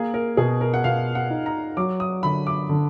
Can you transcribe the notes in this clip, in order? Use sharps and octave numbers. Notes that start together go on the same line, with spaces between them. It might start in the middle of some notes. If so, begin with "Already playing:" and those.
Already playing: A#3 G#4
A#4
B2 G#4
A#4
F#5
B2 F5
F#5
D#4
A#5
F#3 D6
D#6
D3 B5
D6
D3